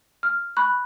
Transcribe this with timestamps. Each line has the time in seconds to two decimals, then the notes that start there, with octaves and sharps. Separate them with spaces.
0.23 F6
0.57 B5 C#6 F#6